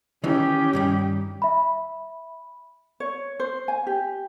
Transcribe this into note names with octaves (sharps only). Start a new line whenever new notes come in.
D#3 E3 C#4 G4
G2 D#3 G3
E5 B5
C#5
C5
G#5
G4